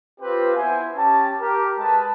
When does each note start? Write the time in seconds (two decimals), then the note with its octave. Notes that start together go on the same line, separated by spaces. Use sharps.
0.21 C4 F4 G4 B4 C5
0.55 B3 E4 C5 G#5
0.96 C#4 G4 A5
1.39 G4 A#4
1.78 G#3 B4 A5